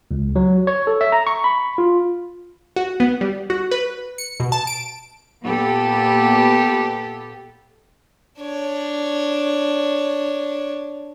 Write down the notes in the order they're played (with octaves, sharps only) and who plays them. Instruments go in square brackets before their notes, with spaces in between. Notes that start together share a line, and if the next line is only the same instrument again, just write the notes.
[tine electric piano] C#2
F#3
C#5
A4
E5
A#5
C#6
B5
F4
[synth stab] F#4
B3
G3
F#4
B4
C#7
B2
A5
D7
[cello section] A#2 B3 G4 A4
[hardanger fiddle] D4 C#5